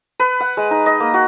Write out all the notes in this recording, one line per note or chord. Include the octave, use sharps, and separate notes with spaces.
B4
F#5
G#3
D#4
D#5
A#3
F#4